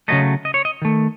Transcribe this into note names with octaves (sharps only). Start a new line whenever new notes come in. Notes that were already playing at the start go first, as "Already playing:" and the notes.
C#3 F#3 A3 D#5
D#5
C#5
D#5
D#3 A3